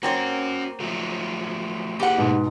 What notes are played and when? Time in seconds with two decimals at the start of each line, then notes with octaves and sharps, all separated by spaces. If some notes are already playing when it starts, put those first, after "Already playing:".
0.03 A#3 C4 C#4 F#4 C#5
0.80 F3 F#3 A3
2.00 A#3 E4 G4 G#4 F#5
2.18 G#2 B2